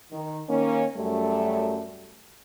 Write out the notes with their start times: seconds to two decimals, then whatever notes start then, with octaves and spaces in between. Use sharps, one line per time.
0.12 D#3
0.49 D#3 A#3 C#4
0.97 F#2 G3 A3